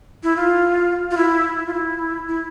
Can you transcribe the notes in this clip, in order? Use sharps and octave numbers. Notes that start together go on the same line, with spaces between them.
E4
F4
F4
E4
E4
F4
E4
E4